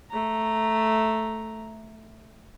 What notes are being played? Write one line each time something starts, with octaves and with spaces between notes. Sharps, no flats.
A3 A#5